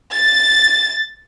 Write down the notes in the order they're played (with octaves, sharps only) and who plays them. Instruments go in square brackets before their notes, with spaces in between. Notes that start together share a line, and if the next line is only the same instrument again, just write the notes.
[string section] A6